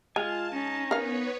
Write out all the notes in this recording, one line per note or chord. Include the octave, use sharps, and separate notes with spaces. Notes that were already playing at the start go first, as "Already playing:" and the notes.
G#3 F4 F5 G#5 A5
C#4 D#4
B3 A#4 B4 C#5 F5